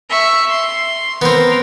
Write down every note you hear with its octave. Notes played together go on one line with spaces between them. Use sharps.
E5 C#6
C6
B3 C4 A#4